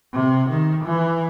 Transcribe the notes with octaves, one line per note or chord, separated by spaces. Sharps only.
C3
D#3
E3